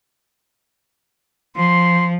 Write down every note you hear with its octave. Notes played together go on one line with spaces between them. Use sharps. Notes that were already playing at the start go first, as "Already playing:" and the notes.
F3 C6